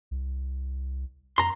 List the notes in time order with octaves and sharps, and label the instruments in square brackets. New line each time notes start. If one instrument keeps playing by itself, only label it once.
[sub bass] C2
[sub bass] F2 [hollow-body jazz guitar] A#5 C6